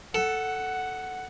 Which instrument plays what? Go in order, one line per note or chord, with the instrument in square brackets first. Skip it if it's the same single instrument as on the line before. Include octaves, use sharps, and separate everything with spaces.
[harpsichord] A4 [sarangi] F#5